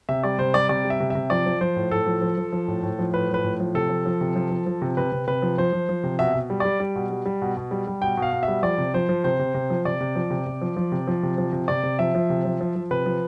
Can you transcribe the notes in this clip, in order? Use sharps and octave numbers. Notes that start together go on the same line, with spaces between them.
C3 E5
G3 D5
C3 C5
G3 D5
C3 D5
G3
E5
C3
C3 E5
F3 D5
F3
F3 C5
A2
A2 A4
F3
F3
F3
F3
A2
A2
F3
A2 B4
F3 B4
A2
F3
C3 A4
F3
F3
C3
F3
F3
F3
C3
C3 B4
C3
C3 B4
F3
F3 C5
F3
F3
C3
B2 E5
B2
G3
G3 D5
G3
B2
G3
G3
B2
B2
G3
G3
B2 G5
B2
F5
B2
E5
G3
F3 D5
C3
F3 C5
F3
C3 C5
C3
C3
F3
C3 D5
C3
F3
C3
C3
F3
F3
C3
F3
C3
F3
C3
C3 D5
C3
F3 E5
F3
C3
F3
F3
F3
C3 B4
F3